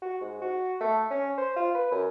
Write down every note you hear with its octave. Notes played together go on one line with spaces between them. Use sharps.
F#4
G#2
F#4
A3
C#4
C5
F4
B4
F#2